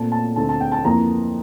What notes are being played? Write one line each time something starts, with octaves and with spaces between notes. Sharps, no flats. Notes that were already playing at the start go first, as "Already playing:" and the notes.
Already playing: A#2 A3 C4 A5
A5
D2 D3 A3 C4 A5
A5
G5
A5
F2 E3 A#3 A#5